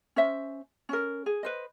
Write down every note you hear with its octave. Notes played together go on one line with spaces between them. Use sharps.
C#4 C5 E5
C#4 A#4
G#4
B4 C5 D#5